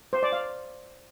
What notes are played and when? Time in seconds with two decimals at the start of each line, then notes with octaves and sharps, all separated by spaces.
0.13 C5
0.23 D5
0.32 F5